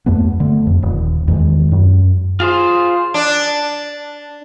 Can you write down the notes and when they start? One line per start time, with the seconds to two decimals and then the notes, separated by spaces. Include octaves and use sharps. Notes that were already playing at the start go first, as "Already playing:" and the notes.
0.06 E2 G2 A3 B3
0.40 D3 A3
0.67 F2
0.83 D#1
1.28 E2 D#3 G#3
1.72 F#2
2.40 F4 G#4 C5
3.14 D4